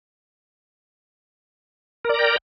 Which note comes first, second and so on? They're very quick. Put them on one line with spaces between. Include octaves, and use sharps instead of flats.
A#4 D5 A#5 G5